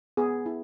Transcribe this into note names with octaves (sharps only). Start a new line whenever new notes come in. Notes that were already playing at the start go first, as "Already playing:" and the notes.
B3 G#4
E4